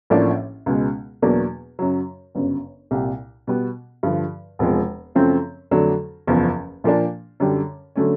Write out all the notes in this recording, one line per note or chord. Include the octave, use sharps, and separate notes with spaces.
A1 A2 F3 A#3 D4
C#2 B2 G#3
E2 B2 F#3 A#3 D4
F#2 C#3 F#3
G1 F#2 C#3
C2 A#2 G3
B2 G3 B3
G2 D3 F3
E1 E2 C3 F3 G#3
F#2 C#3 F3 A3 C4
F2 D3 F#3 A3 D4
F#1 E2 C#3 F3
A#2 F3 A#3 D4
F#2 D3 G3
D3 F#3 A3 C#4